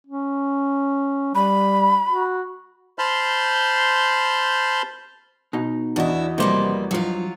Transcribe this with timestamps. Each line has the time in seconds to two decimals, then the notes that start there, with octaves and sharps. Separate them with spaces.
0.07 C#4
1.35 G3 B5
2.08 F#4
2.99 C5 A5 B5 C6 F6 G6
5.53 B2 D#4
5.96 E2 D4 E4 F#4 D#5
6.38 C3 F3 G3 A#3 B4 C5
6.91 G2 F3 F#3 F4